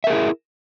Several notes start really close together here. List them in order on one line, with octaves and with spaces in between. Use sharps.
E5 A#4 G#4 E4